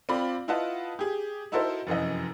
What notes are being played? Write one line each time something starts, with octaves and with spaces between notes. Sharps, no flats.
C4 F4 D5 B5
E4 F4 B4 D#5 F#5 A5
G4 G#4
D#4 E4 F#4 A4 A#4 C5
F1 F#2 E3 D#5